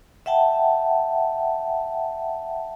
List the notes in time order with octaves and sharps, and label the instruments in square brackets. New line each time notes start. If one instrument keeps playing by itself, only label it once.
[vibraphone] E5 F#5 G5 A5